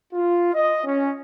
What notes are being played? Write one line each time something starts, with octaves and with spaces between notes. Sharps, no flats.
F4
D#5
C#4